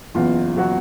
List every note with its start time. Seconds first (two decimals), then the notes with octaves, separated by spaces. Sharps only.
0.14 F#1 E2 B2 F4
0.57 B2 F#3 F#4